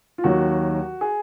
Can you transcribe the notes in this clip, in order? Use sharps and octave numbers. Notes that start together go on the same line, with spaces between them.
F4
D#2 D#3 F#3 F#4
G#4